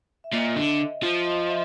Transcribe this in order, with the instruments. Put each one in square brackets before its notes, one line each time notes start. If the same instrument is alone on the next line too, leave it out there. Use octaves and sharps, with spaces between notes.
[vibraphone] E5
[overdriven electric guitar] A#2 [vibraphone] D#5
[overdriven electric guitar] D3
F3
[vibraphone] D#5
E5